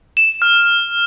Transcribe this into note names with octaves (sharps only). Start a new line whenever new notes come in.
E7
F6